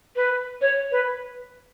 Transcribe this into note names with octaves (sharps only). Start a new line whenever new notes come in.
B4
C#5
B4